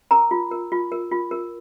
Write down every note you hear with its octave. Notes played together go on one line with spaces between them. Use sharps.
A#4 A#5
F4
A#4
F4
A#4
F4
A#4